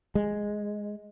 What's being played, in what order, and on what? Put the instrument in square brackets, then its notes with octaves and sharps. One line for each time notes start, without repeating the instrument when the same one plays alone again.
[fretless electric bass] G#3